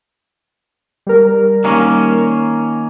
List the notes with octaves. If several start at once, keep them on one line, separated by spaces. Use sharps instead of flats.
G3 A#4
D#3 A#3 C#4